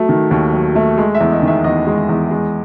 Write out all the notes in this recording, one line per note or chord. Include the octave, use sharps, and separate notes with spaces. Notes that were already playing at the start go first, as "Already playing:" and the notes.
Already playing: F#3 A3
D#3
D#2
F#3
A3
G#3
E5
E2
D#5
D#3 E5
E2 D#5
G#3
E2
G#3